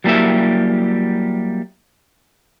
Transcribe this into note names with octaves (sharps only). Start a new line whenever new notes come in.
F#3 G3 A#3 E4 G4 E5